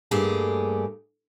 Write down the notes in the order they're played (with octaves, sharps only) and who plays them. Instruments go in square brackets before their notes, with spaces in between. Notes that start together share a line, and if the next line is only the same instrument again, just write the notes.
[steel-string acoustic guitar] G2 A3 A#3 G4 G#4